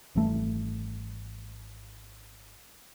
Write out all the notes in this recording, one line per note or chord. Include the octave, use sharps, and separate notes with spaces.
G#1 E3 G3 A3